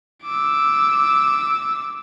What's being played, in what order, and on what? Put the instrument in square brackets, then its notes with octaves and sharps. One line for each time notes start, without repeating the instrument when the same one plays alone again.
[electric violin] D6 E6